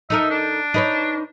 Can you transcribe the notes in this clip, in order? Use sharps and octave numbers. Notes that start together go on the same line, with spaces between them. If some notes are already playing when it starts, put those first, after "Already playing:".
D#4 A4 A#4 E5
D4
D#4 B4 C#5